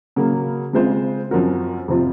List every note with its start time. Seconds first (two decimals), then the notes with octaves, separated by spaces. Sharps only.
0.16 C#3 F#3 A#3
0.73 C#3 G#3 C4 F4 C5
1.31 F#2 F3 C4 F#4 A#4
1.88 F2 C3 F3 C4 F4